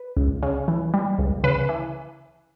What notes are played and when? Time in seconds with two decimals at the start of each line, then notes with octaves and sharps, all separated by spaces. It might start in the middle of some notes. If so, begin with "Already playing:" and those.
Already playing: B4
0.17 C#2
0.43 C#3
0.68 E3
0.94 G3
1.18 C#2
1.44 C#3 B4
1.69 E3